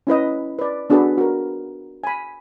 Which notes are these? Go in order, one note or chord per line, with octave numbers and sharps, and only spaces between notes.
C#4 E4 B4 D#5
B4 D5
B3 D4 F#4 G#4 A4 B4
F#4 A#4
G#5 B5